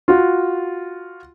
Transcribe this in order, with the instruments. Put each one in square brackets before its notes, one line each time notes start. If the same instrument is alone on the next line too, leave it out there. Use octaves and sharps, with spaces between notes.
[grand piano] F4 F#4